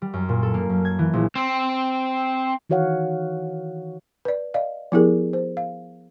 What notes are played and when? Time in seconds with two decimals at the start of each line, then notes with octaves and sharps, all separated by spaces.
0.02 G3
0.13 F#2
0.29 A#2
0.43 A4
0.54 A#3
0.69 F#2
0.85 G#6
0.99 E3
1.13 A#1
1.35 C4
2.70 D#3 E3 F#4 C#5 F5 F#5
4.25 B4 D5
4.54 D5 D#5 F5
4.92 F3 B3 E4 G4 G#4 A#4
5.33 C5
5.57 F5